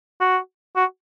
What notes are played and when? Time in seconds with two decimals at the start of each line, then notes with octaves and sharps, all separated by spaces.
0.21 F#4
0.76 F#4